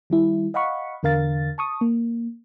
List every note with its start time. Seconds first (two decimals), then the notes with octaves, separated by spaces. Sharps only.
0.10 D#3 G3 E4
0.54 D#5 F5 F#5 B5 C#6
1.03 E2 D3 A#4 F5 A6
1.58 A5 C#6 D#6
1.81 A#3